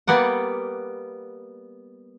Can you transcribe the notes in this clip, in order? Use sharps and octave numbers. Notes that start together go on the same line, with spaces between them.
G3 A#3 B3 D5 F#5